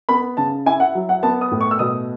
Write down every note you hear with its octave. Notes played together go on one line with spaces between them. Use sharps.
B3 B5
C#3 A5
E4 G#5
F#5
F#3
F#5
B3 A5
D#6
A2
C#6
E6
B2 D#6